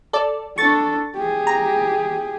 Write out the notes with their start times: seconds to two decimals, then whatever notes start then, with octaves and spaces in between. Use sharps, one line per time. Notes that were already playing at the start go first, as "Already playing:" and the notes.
0.13 A4 D5
0.58 D4 A4 C#6 A6
1.15 G4 G#4
1.47 A#5